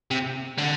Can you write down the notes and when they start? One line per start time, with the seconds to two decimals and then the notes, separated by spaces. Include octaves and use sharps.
0.11 C3
0.58 D3